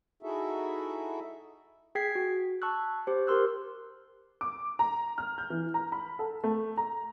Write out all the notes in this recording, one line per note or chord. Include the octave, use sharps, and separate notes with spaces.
D#4 E4 F#4 G#4 A4 E5
G#4 G5 G#6 B6 C7
F#4
A5 C#6 E6 F#6
G4 C5
G4 A#4 C6 E6 F#6
D6
A#5
F6
G6
E3
A#5
B5
A4
A3
A#5